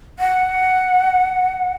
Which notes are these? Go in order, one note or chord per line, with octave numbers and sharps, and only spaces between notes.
F#5